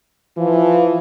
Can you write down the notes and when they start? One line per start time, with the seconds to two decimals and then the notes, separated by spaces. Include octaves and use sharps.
0.37 E3 F3